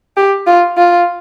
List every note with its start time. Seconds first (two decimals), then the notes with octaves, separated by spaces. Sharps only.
0.17 G4
0.47 F4
0.77 F4